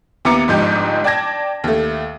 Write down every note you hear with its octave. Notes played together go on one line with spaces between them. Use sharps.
D#2 B3 E4 A#5 D6 C#7
G1 G#2 F3 D#4 G4
D5 G5 A5 G#6 A#6
D#2 A3